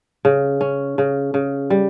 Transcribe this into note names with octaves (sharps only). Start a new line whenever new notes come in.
C#3
C#4
C#3
C#3
G3